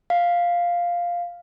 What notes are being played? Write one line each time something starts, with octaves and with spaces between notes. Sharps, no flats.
F5